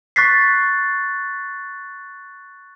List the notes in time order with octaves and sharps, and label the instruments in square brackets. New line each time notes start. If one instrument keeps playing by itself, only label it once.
[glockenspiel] C#6 F#6 A6 B6 C7